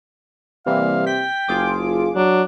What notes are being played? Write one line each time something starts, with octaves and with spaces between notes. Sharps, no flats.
C3 E3 G3 A#3 F5
G5 B6
F#1 F4 G#4 D6
F#3 D4